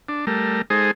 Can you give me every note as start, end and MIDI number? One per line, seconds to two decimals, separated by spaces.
0.09 0.25 62
0.27 0.62 55
0.27 0.62 57
0.27 0.62 70
0.70 0.91 56
0.70 0.91 63
0.70 0.91 68
0.70 0.91 69
0.70 0.91 72